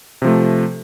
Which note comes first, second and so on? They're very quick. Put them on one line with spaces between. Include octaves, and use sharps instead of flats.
C3 F3 A3